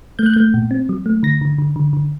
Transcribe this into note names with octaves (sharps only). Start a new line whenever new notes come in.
A3 G6
F#6
A3 G6
A#2
C4
F#3
A3
D3 A#6
D3
D3
D3
D3